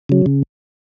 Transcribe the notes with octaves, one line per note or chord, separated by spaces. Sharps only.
C#3 F#3
C#3